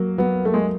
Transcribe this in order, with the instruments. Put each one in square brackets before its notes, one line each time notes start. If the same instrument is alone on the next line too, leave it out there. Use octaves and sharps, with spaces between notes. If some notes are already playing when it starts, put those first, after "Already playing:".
Already playing: [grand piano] F#3 A#3
[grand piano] F#3 [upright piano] B3
[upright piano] A3 [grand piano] A#3
[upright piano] G#3